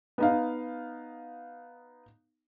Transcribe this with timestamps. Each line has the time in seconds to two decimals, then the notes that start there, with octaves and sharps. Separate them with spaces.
0.18 B3 D#4 F5